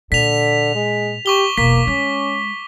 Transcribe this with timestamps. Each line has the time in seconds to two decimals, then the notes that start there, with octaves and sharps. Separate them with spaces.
0.12 A#2 D3 B6 F7
0.75 G#3
1.26 G4 C#6 D6 G7
1.57 E1 B1 A#3 B6
1.87 G#3 C#4